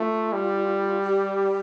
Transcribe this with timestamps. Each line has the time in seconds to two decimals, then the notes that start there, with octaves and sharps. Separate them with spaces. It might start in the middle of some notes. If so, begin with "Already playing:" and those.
Already playing: A3 F4
0.33 G3
1.02 G4